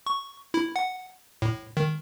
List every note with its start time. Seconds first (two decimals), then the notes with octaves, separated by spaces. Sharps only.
0.07 C#6
0.54 E4
0.76 F#5
1.42 A2
1.77 D#3